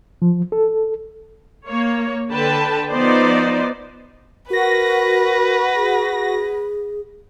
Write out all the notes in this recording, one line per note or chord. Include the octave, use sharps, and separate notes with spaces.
F3
A4
A#3 C#5
D3 B4 G5 A5
F3 B3 D#4 C5 D5
F#4 A#4 B4 A#6
G#4